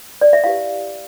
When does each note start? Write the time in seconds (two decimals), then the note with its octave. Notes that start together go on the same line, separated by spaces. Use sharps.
0.21 D5
0.33 E5
0.44 E4 G4 B4 F5